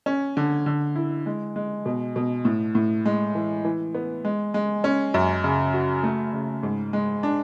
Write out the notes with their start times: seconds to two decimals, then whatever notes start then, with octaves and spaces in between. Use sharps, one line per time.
0.06 C#4
0.37 D3
0.66 D3
0.96 E4
1.26 G#3
1.56 G#3
1.86 B2
2.16 B2
2.45 A2
2.75 A2
3.06 G#3
3.35 E3
3.65 E3
3.94 B3
4.25 G#3
4.54 G#3
4.84 C#4
5.14 F#2
5.44 C#3
5.74 F#4
6.03 A3
6.33 C#3
6.63 G#2
6.93 G#3
7.23 D4